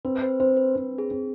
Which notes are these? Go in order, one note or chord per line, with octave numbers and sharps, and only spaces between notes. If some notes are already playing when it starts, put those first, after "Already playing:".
C4 B4
B4
C5
C4 C5
B4
C4 B4
G#4
C4